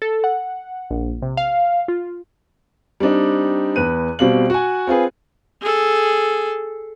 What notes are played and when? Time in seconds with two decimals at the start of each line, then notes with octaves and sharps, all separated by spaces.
0.02 A4
0.24 F#5
0.91 A#1
1.22 C3
1.37 F5
1.88 F4
3.00 G3 C4 D4 D#4
3.76 E2 B4 F#6 D#7
4.19 B2 G3 C4 F5 F#7
4.50 F#4 G#5
4.87 C4 F4 G#4 B4
5.62 G#4 A4